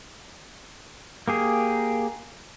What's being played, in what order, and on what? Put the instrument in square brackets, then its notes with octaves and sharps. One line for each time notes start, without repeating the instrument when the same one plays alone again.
[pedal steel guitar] A#3 G4 G#4